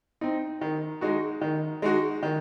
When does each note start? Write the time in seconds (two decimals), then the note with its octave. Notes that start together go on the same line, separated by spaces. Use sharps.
0.21 C4 D#4
0.61 D#3
1.01 G#3 D#4 F#4
1.41 D#3
1.82 G#3 D#4 F#4
2.23 D#3